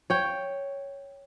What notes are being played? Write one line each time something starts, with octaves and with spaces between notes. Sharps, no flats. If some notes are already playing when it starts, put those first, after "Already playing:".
C#5 G5